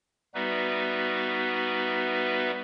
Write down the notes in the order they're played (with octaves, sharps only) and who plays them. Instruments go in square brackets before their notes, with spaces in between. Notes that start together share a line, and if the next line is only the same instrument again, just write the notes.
[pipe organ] G3 B3 D#4 F#4 B4 E5